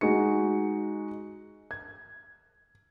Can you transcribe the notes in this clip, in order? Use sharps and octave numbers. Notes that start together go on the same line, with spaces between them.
G#3 D#4 F#4 C#7
G#6